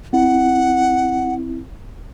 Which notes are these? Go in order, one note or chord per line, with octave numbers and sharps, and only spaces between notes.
C4 E4 F#5